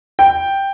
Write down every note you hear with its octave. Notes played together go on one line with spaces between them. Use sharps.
G5